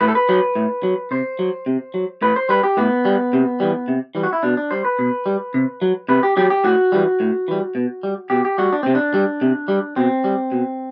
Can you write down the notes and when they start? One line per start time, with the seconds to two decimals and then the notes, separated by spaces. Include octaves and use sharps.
0.01 A2 B4
0.08 A4
0.15 B4
0.29 F#3
0.55 A2
0.83 F#3
1.11 C3 C5
1.39 F#3
1.66 C3
1.94 F#3
2.22 A2 B4
2.36 C5
2.49 G3 B4
2.63 G4
2.77 A2 B3
3.05 G3
3.33 C3
3.60 E3 G3
3.88 C3
4.15 E3 G3
4.23 F#4
4.33 E4
4.43 B2 D4
4.57 D4
4.71 G3 C5
4.85 B4
4.99 B2
5.26 G3
5.54 C3
5.82 F#3
6.09 C3 B4
6.23 G4
6.37 F#3 G4
6.50 G4
6.64 A2 F#4
6.92 E3 G3
7.20 A2
7.48 E3 G3
7.75 B2
8.03 G3
8.30 B2 G4
8.45 G4
8.58 G3 F#4
8.73 D4
8.83 C3 C4
8.95 D4
9.14 G3
9.41 C3
9.68 G3
9.96 B2 C4
10.24 G3
10.52 B2